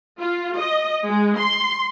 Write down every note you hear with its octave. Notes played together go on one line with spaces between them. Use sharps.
F4
D#5
G#3
C6